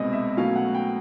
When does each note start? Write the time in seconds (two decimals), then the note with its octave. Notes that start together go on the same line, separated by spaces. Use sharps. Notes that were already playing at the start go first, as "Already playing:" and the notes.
Already playing: C2 B2 G#3 C4 D5 D#5
0.13 E5
0.37 B2 F#3 A3 C#4 F5
0.56 F#5
0.74 G5